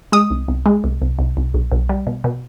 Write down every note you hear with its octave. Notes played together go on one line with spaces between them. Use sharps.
G#3 D#6
C2
C2
G#3
C2
C2
C2
C2
B1
B1
G3
B2
B2